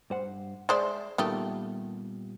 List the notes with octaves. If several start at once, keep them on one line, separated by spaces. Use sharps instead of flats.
G2 C5 F#5
G#3 C5 D5 E5 C6
A#2 D#3 G3 A3 B3 G4